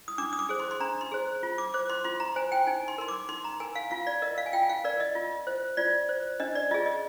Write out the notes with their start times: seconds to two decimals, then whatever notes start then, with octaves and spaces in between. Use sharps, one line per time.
0.08 D#6
0.18 D4 D6
0.33 D#6
0.39 D6
0.49 G#4 C5
0.60 C6
0.71 C6
0.80 D4 A#5
1.01 C6
1.11 G#4 C5
1.43 F4
1.58 D6
1.74 C5 D6
1.90 C6
2.04 F4 C6
2.20 A#5
2.36 C5 G#5
2.52 G5
2.67 D#4 G#5
2.88 C6
2.98 A#4 C6
3.08 D6
3.29 D#4 C6
3.44 A#5
3.60 A#4 G#5
3.76 F5
3.91 F4 F5
4.07 D5
4.22 A#4 D#5
4.38 F5
4.46 G#5
4.53 F4 G5
4.69 F5
4.84 A#4 D5
5.00 D#5
5.15 F4
5.47 C5
5.77 F4 D5
6.09 C5
6.40 D4 D#5
6.55 D5
6.71 F4 D#5
6.74 G#4
6.86 D#5